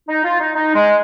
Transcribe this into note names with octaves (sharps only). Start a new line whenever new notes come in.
D#4
F4
D#4
D#4
G#3